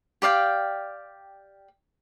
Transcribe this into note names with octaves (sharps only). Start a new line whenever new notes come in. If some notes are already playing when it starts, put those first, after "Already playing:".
G4 D5 F5 G5